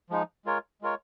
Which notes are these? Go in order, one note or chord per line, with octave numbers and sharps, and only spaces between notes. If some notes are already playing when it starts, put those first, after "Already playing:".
F3 G#3 D#4
G#3 F4 A#4 C#5
G#3 F4 A#4 C#5